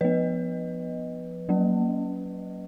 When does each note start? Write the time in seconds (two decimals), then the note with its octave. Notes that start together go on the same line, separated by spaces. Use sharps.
0.01 F3 B3 B4 D#5
1.49 F#3 A#3 C#4